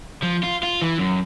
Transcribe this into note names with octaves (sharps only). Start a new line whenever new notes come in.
F3
F4
F4
E3
F#2